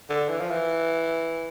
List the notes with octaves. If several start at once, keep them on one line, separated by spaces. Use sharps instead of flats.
D3
E3
F3
E3